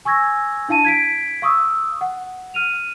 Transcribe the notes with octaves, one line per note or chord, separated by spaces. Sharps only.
G#5 C#6 E6 G#6 A#6
D4 E4 F5 A5 D#7
G#6 B6 D7
F5 C#6 D#6 E6
F#5
F6 D#7 F7